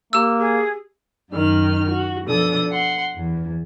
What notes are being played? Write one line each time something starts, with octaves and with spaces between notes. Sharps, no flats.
A#3 G4 E6
G#4
F#2 D#3 D#4 F6
F#4
B2 F3 D4 A4 D#6
F#5 C6
E2